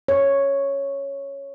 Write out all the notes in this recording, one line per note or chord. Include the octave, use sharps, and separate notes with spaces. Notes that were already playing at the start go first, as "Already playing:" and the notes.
C#5